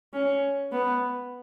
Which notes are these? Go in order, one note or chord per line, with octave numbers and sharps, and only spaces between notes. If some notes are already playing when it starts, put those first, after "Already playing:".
C#4
B3